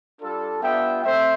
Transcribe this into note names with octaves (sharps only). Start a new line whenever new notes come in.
G3 D4 F4 A4
G3 B3 D4 F4 E5 G5
A3 C4 C5 E5